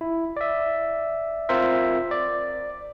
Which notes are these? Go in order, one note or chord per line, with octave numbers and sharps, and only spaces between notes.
E4
D5 E5
C4 F4 A#4 C5 E5
D5